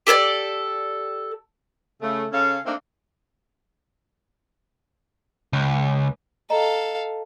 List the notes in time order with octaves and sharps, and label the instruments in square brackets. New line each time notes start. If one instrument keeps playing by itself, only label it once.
[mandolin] G4 A4 A#4 D5
[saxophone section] C#3 A3
C#3 C#4 A4 F5
A3 A#3 C4 D4 D#4
[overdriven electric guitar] C#2
[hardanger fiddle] A4 F5 [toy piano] D#5 A#5